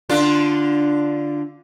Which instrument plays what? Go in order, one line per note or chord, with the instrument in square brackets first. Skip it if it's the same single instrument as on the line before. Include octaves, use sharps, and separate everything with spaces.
[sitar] D3 D4 F4